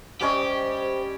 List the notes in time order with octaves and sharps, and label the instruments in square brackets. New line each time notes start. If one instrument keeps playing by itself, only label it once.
[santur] G3 C#4 D#5 [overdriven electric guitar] G4 [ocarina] C5